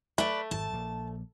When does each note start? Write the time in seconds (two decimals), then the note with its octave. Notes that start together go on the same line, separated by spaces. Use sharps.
0.18 A3 B4 D5
0.51 G#1 G#2 A5
0.73 A#1 A#3